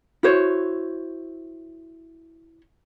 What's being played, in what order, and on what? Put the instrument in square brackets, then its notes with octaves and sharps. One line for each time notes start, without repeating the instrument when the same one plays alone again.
[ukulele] E4 F#4 C5 C#5